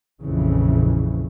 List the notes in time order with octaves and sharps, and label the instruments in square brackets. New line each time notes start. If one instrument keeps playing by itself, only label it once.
[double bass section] A#1 F2 C#3 E3